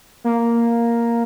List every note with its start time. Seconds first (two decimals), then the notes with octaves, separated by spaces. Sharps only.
0.24 A#3